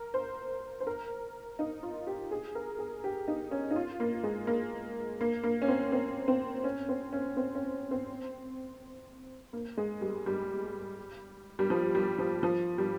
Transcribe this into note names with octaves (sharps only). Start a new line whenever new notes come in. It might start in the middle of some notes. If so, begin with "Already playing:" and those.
Already playing: A#4
C5
C5
A#4
D#4
F4
G4
G#4
A#4
G#4
G4
D#4
C#4
D#4
F4
A#3
G#3
A#3
A#3
A#3
C#4
C4
C4
C4
C#4
C4
C#4
C4
C#4
C4
A#3
G#3
G3
G3
G3
F3
G3
F3
F3
G3